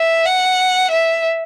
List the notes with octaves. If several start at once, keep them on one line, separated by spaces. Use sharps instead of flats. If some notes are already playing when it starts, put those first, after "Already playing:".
Already playing: E5
F#5
E5